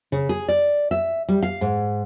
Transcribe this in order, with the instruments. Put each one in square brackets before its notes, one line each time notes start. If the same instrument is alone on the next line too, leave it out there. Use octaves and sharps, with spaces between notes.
[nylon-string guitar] C#3
G#4
D5
E5
G3
F5
G#2